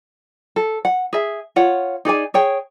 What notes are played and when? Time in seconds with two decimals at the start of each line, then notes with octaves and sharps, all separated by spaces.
0.56 A4
0.85 F#5
1.13 G#4 E5
1.56 F4 C#5 F#5
2.05 D#4 G#4 D5 G#5
2.34 G#4 C#5 G5